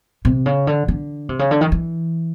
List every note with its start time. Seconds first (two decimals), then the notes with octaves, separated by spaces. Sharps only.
0.25 C3
0.46 C#3
0.67 D3
0.88 D3
1.29 C3
1.39 C#3
1.51 D3
1.61 D#3
1.72 E3